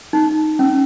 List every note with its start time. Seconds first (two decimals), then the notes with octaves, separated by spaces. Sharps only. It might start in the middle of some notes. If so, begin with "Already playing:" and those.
0.13 D#4
0.59 C#4